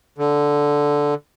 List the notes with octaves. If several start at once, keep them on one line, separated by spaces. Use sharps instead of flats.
D3